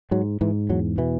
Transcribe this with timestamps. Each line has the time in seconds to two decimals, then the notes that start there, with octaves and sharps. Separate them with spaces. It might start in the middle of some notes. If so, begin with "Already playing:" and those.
0.11 G#2 F#3
0.41 G#2 E3
0.69 E2 F#3
0.98 B2 E3